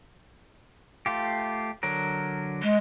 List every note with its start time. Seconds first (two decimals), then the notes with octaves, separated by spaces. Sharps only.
1.06 A3 F4 G4
1.83 D3 F#3 A#4
2.62 G#3